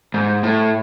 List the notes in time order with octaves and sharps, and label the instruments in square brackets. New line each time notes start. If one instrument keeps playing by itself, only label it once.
[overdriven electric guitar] G#2
A2